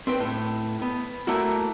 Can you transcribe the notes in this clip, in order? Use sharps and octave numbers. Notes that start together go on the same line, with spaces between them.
C4 B4 G5
A2
B3
A3 A#3 E4 F#4